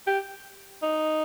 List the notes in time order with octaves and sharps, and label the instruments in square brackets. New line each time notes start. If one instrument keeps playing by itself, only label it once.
[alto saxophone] G4
D#4